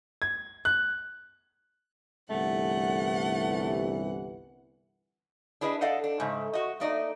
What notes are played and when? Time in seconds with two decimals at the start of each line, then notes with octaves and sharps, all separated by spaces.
0.22 G#6
0.65 F#6
2.30 G1 C2 E3 A3 F#5
5.61 D4 E4 G#4 B4 D#5
5.81 A4 D5 D#5 F5 F#5
6.04 D4
6.20 G#2 C#3 A3
6.53 F#4 D#5
6.80 A3 A#3 D#4 D5 D#5